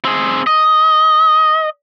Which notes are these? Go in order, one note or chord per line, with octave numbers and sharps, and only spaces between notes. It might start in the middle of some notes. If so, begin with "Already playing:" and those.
C4 G#4
D#5